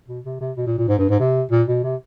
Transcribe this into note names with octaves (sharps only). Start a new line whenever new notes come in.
B2
C3
C3
B2
A#2
A#2
G#2
G2
G#2
C3
A#2
B2
C3